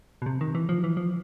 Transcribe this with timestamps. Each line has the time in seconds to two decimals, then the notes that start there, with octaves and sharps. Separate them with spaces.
0.22 B2
0.26 C3
0.41 D#3
0.55 E3
0.69 F3
0.84 E3
0.97 F3